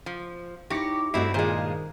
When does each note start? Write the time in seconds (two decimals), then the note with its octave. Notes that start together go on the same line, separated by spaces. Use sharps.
0.06 F3
0.70 D#4 E4 G4 C#5 C#6 A#6 C#7
1.14 G2 A3 C4 E4 F#4 D5 D#5 C7
1.34 A#2 D#3 G#3 F4 G#4 C5